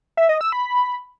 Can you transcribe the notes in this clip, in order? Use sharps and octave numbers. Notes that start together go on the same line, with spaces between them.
E5
D#5
E6
B5